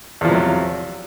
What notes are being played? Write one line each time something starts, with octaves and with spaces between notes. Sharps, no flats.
E2 C3 F3 F#3